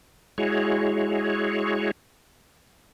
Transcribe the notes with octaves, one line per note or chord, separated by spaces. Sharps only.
G#3 E4 F#4 G#4 C#5